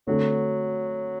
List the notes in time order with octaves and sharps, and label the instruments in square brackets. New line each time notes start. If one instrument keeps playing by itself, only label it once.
[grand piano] D3 A3 C4 F#4 A4 [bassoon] F#3